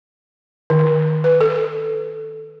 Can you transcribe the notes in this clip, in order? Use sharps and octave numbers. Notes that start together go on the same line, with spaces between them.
D#3
B4
A4